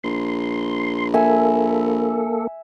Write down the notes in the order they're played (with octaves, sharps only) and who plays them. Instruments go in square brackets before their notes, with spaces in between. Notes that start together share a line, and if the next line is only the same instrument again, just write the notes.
[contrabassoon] A#1 [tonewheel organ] C6
[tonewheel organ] A#3 A4 [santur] E5 G#5